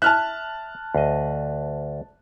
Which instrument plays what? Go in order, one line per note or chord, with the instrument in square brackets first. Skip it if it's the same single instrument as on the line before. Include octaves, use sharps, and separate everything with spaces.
[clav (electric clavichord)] E5 [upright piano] A5 F6 F#6
[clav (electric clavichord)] D2 D#5